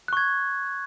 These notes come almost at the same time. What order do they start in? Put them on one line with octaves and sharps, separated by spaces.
F#6 C#6 G#6